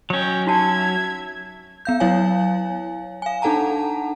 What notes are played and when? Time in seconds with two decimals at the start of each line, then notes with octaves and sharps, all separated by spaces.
0.10 F#3 C#4 D#5 G5
0.47 D#4 F#4 E5 A5 G#6
1.85 B3 F5 G6
2.00 F#3 E4 C#5 F5 G#5
3.22 F5 G#5
3.42 D4 D#4 A4 F#5 A5 A#5